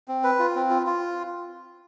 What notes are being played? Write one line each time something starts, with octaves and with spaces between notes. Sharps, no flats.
C4
B4
F4
C4
F4
F4